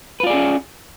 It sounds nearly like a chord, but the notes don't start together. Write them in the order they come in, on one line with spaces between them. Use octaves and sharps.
B4 F4 D5 G#4 C#4